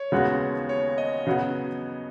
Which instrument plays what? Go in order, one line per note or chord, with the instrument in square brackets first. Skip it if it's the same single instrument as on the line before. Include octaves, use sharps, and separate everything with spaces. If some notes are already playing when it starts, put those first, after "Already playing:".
Already playing: [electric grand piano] C#5
[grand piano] D#2 C#3 G#3 B3 F#4
[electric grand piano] C#5
D#5
[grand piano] C#3 F#3 B3 F#4